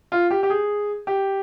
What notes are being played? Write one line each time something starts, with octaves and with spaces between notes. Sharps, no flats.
F4
G4
G4
G#4
G4